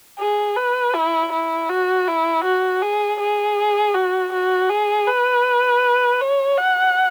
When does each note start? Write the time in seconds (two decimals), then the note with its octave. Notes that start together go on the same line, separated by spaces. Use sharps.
0.19 G#4
0.56 B4
0.94 E4
1.32 E4
1.69 F#4
2.07 E4
2.44 F#4
2.82 G#4
3.20 G#4
3.94 F#4
4.33 F#4
4.69 G#4
5.07 B4
6.21 C#5
6.58 F#5